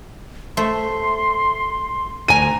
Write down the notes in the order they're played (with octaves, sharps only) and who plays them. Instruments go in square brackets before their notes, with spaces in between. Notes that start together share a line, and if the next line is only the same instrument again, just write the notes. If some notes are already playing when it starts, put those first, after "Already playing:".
[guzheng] A3 C5 E5 [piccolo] C6
[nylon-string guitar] D2 G#5 [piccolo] A#5 [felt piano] D#7